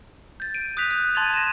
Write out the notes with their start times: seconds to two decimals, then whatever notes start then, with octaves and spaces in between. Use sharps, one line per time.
0.40 G6 A6
0.54 D7 D#7
0.77 D#6 F#6 G6 B6 F7
0.91 F#6
1.15 A5 C6 G#6 A6 D#7 F7
1.34 A#6 E7